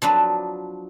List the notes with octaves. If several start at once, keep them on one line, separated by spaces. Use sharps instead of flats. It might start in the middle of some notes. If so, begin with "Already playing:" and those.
F3 F#3 D4 B4